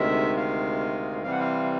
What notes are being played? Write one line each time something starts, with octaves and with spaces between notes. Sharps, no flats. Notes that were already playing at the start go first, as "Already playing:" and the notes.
Already playing: D2 C3 D#3 G#3 E5
F5
C3 E3 G3 C4 F5
F#5
F5